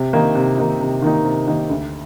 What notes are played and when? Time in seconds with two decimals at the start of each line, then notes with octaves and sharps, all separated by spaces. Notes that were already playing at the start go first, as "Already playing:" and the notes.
Already playing: C3
0.13 D#3 A#3 D#4
0.35 C3
0.58 D#3 A#3 D#4
0.80 C3
1.02 D#3 A#3 D#4
1.24 C3
1.47 D#3 A#3 D#4
1.69 D2